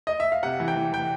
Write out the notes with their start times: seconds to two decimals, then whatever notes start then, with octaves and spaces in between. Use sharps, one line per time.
0.07 D#5
0.20 E5
0.32 F5
0.43 C3 F#5
0.60 E3
0.68 G5
0.76 E3
0.93 E3 G5